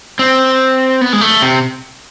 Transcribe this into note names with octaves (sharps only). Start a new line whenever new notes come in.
C4
B3
G#3
A3
C3